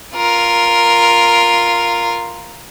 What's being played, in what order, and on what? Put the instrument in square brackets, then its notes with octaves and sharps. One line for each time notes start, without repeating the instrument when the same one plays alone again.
[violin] F4 A#4